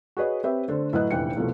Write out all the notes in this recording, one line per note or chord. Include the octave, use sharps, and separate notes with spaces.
F#4 G#4 B4 C#5 D#5
C4 G4 B4 C#5 E5
D3 A3 D4 A4 C5
A2 F#3 B4 D#5 F#6
F1 A#1 E3 G5 C#7
C2 B2 F3 A3